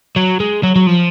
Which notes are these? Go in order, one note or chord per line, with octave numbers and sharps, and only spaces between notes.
F#3
G#3
F#3
F#3
F3